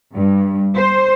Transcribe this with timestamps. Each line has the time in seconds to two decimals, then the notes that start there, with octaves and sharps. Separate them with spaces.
0.14 G2
0.77 C5